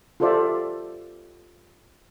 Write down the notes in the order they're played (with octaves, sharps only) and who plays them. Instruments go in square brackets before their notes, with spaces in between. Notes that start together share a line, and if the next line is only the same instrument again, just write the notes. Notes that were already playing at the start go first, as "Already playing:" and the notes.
[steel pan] F4 G4 A4 C5 D5 E5